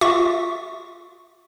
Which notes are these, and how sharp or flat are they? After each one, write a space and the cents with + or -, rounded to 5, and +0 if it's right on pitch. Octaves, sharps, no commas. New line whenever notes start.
F4 +0 E5 -15 C#6 +0